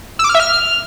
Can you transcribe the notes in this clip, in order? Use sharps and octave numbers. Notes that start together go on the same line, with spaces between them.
E6
D6
F6
E5
F6